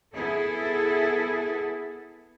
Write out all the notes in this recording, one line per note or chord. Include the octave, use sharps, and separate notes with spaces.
B3 E4 G#4 A4